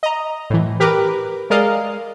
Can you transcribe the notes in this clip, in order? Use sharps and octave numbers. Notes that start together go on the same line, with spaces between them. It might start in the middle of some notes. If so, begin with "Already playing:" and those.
D#5 A#5
A2 E3
G4 A#4 B4 D6
G#3 A#4 D5 D#5 F5